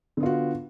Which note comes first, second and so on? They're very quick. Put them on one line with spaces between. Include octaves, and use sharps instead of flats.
D3 B3 F4 F#4